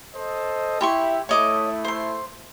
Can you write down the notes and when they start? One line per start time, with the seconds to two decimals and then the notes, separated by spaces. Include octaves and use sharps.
0.15 A4 C5 D#5
0.81 E4 G4 C6 C#6
1.29 A3 E4 C#5 D#5 D6
1.84 C5 C6